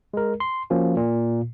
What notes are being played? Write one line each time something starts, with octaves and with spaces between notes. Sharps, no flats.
G#3 A#4
C6
F3 A#3 C#4 F#4
A#2